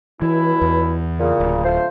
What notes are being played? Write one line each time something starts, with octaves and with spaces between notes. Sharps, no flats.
C#2 B2 E3 E4
E2
A#2 C#3
D1
A3 F4 C5